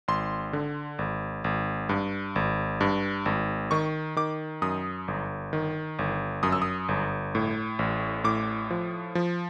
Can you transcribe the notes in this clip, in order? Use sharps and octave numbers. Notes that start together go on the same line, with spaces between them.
G#1 C6
D3
G#1
G#1
G2
G#1
G2
G#1
D#3 C#6
D#3 D6
F#2 D#6
G1
D#3
G1
F#2 D#6
E6
D#6
G1
A2
A1
A2 D6
F3
F3